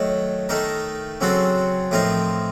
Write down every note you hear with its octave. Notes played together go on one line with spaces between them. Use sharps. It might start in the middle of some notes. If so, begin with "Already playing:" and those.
Already playing: D#3 F#3 A3
D#3 A3 D#4 A#4
C#3 F#3 C4 F#4 A4
A2 F3 C4 D#4 A#4